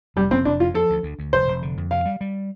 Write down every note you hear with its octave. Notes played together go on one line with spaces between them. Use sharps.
F1 G3
F1 C4
F1 D4
F2 F4
F3 A4
D2
D2
D2
F1 C5
F1
D3
F2
C3 F5
G3
G3